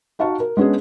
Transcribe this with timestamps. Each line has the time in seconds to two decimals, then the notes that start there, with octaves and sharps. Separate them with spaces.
0.19 D#4 F#4 F5 A5 C#6
0.40 A#4
0.57 G#3 B3 C#4 D4 G#4